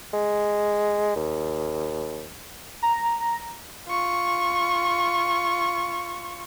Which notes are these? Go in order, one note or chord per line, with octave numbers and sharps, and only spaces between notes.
G#3
D#2
A#5
F4 C#6